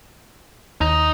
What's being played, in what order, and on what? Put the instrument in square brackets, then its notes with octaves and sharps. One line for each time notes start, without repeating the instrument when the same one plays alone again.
[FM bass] D#2 [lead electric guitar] D#4